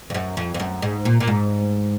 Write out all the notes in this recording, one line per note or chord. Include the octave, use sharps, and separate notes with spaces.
F2
F#2
F2
F2
F#2
G#2
A#2
A#2
G#2